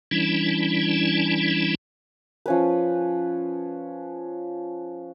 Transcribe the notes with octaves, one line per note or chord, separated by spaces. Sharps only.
E3 G3 C#4 D4 E4
F3 C#4 B4